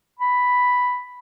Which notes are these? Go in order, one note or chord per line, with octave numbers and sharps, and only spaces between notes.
B5